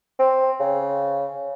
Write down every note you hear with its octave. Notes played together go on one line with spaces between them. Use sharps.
C4
C#3